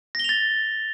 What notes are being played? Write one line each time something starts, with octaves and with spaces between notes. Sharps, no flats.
A6 A#6 F7 G7